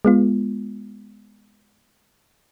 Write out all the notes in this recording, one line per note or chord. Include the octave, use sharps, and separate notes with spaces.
G#3 B3 F4